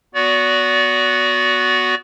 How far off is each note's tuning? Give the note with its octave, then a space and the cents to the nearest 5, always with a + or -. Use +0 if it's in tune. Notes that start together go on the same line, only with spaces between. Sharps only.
B3 +0 F#4 +0 D5 -35